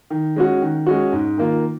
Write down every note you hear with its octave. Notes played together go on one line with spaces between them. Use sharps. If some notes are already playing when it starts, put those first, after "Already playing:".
D#3
G#3 C#4 F#4
D#3
G#3 C#4 F#4
G#2
D#3 A#3 F4